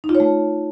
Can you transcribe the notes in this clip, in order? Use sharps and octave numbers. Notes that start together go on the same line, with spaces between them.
D#4
F4
C#5
A3